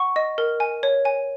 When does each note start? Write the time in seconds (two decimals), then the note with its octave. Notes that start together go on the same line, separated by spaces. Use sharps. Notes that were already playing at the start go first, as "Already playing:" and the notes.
Already playing: F#5 C#6
0.16 D#5
0.38 A#4
0.60 G#5
0.83 C#5
1.05 G#5